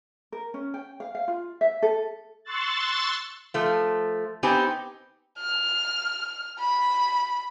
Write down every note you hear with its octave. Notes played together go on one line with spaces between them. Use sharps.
A#4
C#4
G5
F5
F5
F4
E5
A4
C6 C#6 E6 F#6 A6
F3 A3
B3 C4 D#4 G4 G#5
F6
B5